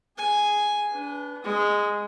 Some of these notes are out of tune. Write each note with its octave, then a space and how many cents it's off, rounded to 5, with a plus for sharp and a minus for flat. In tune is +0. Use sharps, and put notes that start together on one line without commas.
G#4 +0 G#5 +0
D4 -25 B4 +0
G#3 -10 D#6 +25